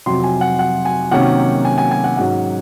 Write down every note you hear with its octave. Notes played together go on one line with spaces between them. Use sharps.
F2 C3 F#3 C6
G#5
F#5
F#5
G#5
C3 D#3 F#3 A#3 C#4 F#5
G#5
G#5
G#5
F#5
G#2 F#3 C#4 F#5